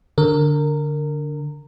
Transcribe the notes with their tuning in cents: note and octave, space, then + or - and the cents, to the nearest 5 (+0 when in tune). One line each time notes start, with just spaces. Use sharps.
D3 +0 A#4 -20